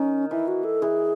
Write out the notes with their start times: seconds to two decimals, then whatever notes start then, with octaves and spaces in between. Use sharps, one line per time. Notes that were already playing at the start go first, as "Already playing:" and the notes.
Already playing: D#3 C#4
0.31 E3 E4
0.48 F#4
0.64 A4
0.82 E3 G#4